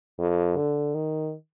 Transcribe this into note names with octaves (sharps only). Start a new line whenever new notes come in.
F2
D3
D#3